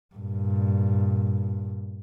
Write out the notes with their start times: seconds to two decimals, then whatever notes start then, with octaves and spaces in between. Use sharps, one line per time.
0.15 G2 A#2